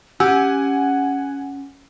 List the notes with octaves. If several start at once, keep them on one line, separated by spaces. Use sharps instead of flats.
C#4 G4 F#5 G#5 E6